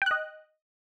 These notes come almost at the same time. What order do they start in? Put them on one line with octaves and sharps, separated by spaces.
G5 F#6 D#5